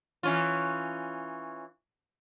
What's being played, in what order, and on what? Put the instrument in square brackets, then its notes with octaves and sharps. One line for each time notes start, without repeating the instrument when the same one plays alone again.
[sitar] E3 C#4 F4